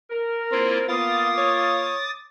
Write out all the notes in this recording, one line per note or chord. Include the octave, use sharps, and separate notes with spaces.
A#4
A#3 C4 E4 F4
A#3 B3 F4 D6 D#6 A6
C#5